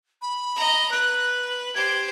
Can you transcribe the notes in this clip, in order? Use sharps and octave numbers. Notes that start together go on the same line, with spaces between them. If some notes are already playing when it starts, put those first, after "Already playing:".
B5
D#5 A#5
B4 F#6
G4 C5 G#6